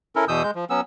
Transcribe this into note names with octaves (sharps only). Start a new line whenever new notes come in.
C#4 E4 A4 A#4
E2 B2 E3 D#6 E6 G6
G#3 G6
F3
F#3 B3 C#4 E6